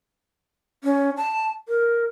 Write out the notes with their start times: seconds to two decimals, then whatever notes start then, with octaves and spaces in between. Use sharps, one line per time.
0.84 C#4
1.17 A5
1.68 A#4